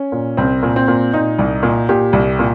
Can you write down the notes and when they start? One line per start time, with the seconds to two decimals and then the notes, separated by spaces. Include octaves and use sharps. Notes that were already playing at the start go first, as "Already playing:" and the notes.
Already playing: C#4
0.12 A#2
0.37 C2 C4
0.63 A#2
0.76 C4
0.88 A#2
1.13 A#2 D#4
1.39 C2
1.63 A#2
1.89 A#2 G4
2.13 C2
2.39 A#2